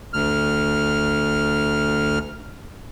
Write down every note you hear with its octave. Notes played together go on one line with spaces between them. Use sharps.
D2 F6